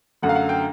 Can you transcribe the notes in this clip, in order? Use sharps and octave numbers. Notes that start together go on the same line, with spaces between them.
F#2 D3 F#3 A3 F#5
F5
F#5
G5